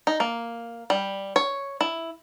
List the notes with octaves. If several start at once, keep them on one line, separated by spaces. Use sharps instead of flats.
D#4
A#3
G3
C#5
E4